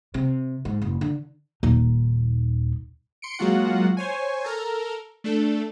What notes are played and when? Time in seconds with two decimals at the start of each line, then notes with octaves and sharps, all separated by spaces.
0.14 C3
0.65 G#2
0.82 F#1
1.01 D3
1.63 D#1 D#4
3.22 C6 C#7 D7
3.39 F#3 G#3 A#3 F4 F#4 F#5
3.97 C5 C#5 G#5
4.44 A4 A#4 A#5
5.24 A3 D4 A4